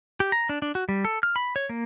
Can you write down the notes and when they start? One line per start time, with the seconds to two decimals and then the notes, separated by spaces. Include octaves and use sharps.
0.20 G4
0.32 A#5
0.49 D4
0.62 D4
0.75 F#4
0.89 G3
1.05 A4
1.23 F6
1.36 B5
1.56 C#5
1.69 A#3